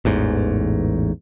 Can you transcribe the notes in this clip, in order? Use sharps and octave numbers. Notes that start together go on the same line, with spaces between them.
A1 E2 G#2